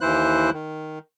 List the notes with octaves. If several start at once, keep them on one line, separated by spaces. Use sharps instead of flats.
D#2 E3 E4 C5 F#6
D#3